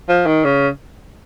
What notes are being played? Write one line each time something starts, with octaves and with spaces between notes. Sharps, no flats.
F3
D#3
C#3